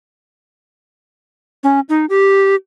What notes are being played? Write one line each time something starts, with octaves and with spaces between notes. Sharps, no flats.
C#4
D#4
G4